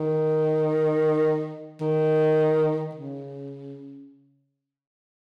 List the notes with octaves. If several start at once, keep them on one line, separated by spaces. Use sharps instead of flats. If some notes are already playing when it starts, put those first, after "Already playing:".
Already playing: D#3
D#3
C#3